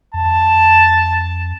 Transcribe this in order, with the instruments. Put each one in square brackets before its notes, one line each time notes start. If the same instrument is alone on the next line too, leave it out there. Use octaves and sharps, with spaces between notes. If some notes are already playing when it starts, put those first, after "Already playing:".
[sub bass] F2 [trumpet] A5